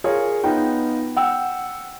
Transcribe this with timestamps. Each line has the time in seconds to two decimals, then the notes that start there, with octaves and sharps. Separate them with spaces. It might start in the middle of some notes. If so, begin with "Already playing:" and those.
0.04 F4 G#4 A#4 C#5
0.43 B3 D#4 F4 G5
1.16 F#5 G5 E6